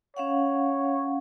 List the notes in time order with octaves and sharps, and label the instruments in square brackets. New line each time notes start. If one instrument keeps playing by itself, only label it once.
[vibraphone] C#4 F5 F#5 [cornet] C#5